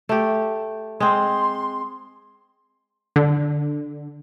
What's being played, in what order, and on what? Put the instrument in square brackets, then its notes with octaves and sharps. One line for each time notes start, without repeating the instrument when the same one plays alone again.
[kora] A3 G4
[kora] G#3 C4 [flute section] C6
[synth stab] D3